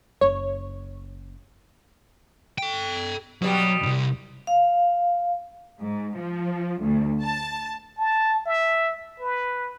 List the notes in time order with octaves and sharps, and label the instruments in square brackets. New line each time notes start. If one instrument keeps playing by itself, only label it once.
[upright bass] F#1 [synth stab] C#5
[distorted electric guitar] A4 G5
[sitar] B2 G3 [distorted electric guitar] F#3
[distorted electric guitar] C2 G2
[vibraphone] F5
[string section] G#2
F3
D2
A5
[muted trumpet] A5
E5
B4